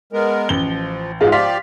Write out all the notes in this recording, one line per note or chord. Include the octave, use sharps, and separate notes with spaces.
G#3 B3 A#4
A1 F3 G7
G#2 E3 F#3 G#3 F4
F3 G4 D5 F5 C6 B6